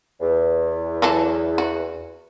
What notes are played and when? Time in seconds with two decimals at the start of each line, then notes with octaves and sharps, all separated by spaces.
0.20 E2
1.02 E3 F#3 A4
1.58 F#4